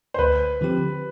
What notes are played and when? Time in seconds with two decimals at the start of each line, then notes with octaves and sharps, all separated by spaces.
0.14 C5
0.19 D2 B4
0.61 D3 F3 C4 G4